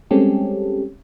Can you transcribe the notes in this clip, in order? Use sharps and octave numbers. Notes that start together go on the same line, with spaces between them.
G3 G#3 C4 C#4 G4 A4